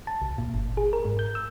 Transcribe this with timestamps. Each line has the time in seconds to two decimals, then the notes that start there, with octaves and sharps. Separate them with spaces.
0.07 A5
0.22 C2
0.38 A#2
0.54 G1
0.77 G#4
0.93 A#4
1.05 G#2
1.19 G6
1.35 E6